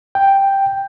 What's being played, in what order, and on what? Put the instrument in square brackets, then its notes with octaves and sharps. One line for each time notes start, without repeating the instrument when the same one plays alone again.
[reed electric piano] G5